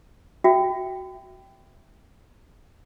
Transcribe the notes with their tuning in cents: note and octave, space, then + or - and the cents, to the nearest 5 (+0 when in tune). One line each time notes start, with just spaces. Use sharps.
F#4 +0 E5 +0 G5 +0